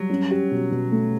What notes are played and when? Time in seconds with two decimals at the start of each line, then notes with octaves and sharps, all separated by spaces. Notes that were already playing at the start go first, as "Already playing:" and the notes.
Already playing: F#3 G3
0.09 C#4
0.31 G4
0.51 B2
0.72 B2
0.92 A3